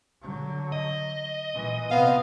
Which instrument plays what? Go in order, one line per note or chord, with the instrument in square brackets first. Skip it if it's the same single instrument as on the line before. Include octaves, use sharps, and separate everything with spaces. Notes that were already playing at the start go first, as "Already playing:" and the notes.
[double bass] D3 F#3
[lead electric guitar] D#5
[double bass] A#2 E3
[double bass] C3 C4 [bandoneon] B3 [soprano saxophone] F5